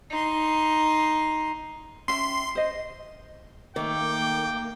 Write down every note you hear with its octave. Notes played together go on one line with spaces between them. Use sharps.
D#4 C6
C#4 E5 G5 C6
C5 D#5
D#3 A3 A#3 G5 D6